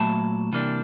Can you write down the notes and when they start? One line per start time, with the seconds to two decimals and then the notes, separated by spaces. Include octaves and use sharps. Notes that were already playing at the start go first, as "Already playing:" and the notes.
Already playing: A#2 F#3 A3 A5 B5
0.53 C3 E3 G3 A#3 D4